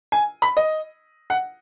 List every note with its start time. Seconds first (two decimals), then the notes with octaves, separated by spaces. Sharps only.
0.12 G#5
0.42 B5
0.57 D#5
1.30 F#5